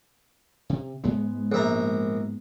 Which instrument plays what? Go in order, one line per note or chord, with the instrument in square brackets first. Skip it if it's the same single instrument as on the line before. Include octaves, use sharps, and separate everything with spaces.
[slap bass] C3
G#2 G#3 B3
[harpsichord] A#1 E5 A#5